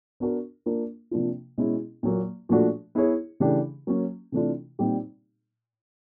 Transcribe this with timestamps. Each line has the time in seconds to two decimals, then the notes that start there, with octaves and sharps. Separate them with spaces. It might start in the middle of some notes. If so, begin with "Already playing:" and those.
0.20 B3 D4 F#4 A#4
0.66 A#3 D4 F4 A#4
1.11 C3 F3 A#3 D4 F4
1.58 B2 G#3 C#4 E4
2.03 A#2 F#3 A#3
2.49 A#2 F3 A3 D4 F#4
2.95 B3 E4 G#4 C#5
3.40 C#3 E3 A3 D4 G4
3.87 F#3 A#3 C#4
4.32 C3 E3 A3 D4 F4
4.79 A#2 G3 C4 D#4 G4